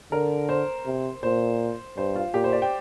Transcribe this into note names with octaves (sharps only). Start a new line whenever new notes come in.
D3 A#4
C5
C3
A#2 C5
G2 C5
F4
A#2 G4
C5
D5
G5